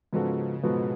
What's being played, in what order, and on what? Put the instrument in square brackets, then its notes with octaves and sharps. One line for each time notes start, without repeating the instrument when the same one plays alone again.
[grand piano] G#2 F3 B3 F#4 A4 [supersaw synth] C#3
[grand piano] G#2 F3 B3 F#4 A4 [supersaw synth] B2